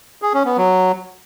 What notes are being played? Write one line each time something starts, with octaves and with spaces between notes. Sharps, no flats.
G#4
C#4
B3
F#3